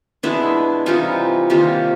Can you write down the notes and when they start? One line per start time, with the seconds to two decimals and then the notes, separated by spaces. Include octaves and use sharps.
0.23 B2 G#3 B3 D4 E4
0.86 C3 E3 G3 D#4 F4
1.50 C3 D#3 G3 A#3 F4 G4